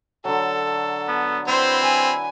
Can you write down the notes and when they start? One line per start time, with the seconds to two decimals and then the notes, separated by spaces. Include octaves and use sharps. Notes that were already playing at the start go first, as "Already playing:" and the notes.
0.25 D3 F#3 A4
1.08 B3
1.48 C4 E4 B4 C5 D5
1.83 B4 G#5